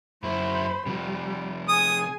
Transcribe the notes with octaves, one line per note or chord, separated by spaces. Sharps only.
F#2 E4 C5 B5
C3 F3 G3
G#4 G#5 D#6